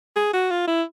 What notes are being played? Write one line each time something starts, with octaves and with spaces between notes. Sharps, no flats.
G#4
F#4
F4
E4